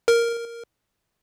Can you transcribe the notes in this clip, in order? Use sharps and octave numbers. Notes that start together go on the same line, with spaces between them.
A#4